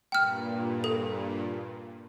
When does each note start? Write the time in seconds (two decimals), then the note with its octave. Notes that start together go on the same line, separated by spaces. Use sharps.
0.12 G2 A#2 G5 F6
0.84 A4